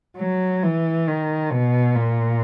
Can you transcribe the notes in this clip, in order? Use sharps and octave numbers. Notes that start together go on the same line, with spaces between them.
F#3
E3
D#3
B2
A#2